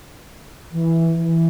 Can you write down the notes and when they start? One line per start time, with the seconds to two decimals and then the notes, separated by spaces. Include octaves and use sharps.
0.72 E3
1.16 E3